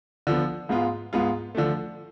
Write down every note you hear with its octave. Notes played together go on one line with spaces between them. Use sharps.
D3 F3 B3
G#2 G#3 B3 F4
G#2 G#3 B3 F4
D3 F3 A3